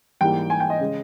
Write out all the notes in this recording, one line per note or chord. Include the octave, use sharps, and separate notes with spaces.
G#2 E3 G3 A#3 G5
G#5
G5
D#5
C#3 G#3